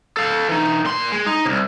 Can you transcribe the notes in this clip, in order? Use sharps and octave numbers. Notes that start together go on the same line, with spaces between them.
A4 F5
E3 D#4
A#2 C6
G#3
D#4
C2 C3